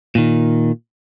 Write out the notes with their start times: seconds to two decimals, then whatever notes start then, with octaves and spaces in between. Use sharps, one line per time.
0.15 A#2 D#3